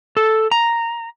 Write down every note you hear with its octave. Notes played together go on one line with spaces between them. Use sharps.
A4
A#5